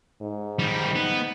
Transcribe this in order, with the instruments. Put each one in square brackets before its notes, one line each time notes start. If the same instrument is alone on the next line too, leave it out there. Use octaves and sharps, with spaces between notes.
[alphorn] G#2
[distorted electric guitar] D#3 G3
B3